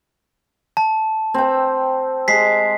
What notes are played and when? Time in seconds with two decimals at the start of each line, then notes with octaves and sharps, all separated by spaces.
0.77 A5
1.34 C4 G5
2.28 G#3 B6 C7